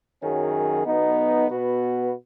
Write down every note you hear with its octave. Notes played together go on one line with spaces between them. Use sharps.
F#2 D#3 F#3 C#4 G#4
B1 B2 B3 D#4
B2 B3 F#4 B4